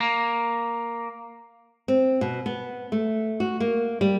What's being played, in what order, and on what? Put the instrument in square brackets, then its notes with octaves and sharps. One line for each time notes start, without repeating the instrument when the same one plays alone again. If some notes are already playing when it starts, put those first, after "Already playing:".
[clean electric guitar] A#3
[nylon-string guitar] C4
B2
B3
A3
F#4
A#3
G3